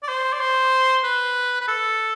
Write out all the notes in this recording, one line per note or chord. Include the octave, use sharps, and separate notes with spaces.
D5
C5
D5
C5
B4
B4
A4